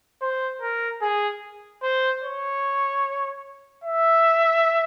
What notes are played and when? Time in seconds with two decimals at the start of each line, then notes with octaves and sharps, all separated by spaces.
0.22 C5
0.61 A#4
1.02 G#4
1.83 C5
2.23 C#5
3.84 E5